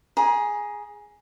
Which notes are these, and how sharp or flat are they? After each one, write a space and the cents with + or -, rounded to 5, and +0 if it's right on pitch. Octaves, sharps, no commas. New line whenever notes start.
G#4 +0 A#5 +30